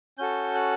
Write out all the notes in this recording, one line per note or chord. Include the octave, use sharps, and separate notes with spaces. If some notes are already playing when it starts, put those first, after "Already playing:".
C#4 F#4 A4 G6
F#6